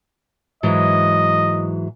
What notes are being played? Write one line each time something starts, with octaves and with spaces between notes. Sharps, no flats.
G#2 E3 F#3 D#5